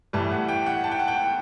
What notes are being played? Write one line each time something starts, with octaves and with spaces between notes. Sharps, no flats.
A2 E3 G3 A5
F#5
G5
F#5
A5
G5
F#5
G5